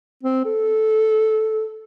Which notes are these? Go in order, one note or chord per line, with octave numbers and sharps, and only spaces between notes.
C4
A4